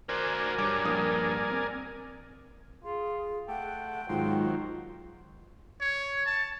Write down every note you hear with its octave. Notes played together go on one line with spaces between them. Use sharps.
F#4 A#4 C5 D5 G#5
G2 C#5 D6
A#1 A#3 D#6
C4
F4 G#4
A3 F#5 G5
D#2 G#2 F#3 F4 C5
C#5
A5